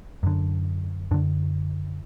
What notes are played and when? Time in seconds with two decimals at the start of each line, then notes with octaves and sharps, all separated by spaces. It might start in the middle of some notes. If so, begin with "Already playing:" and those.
0.23 F#2 D3
1.11 F#2 D3 D4